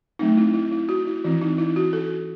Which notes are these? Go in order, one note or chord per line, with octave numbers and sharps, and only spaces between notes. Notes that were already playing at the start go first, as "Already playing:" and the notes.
F#3 A3 C4 D#4
E4
E4
E4
F#4
E4
E3 C4 E4
D#4
E4
F#4
A4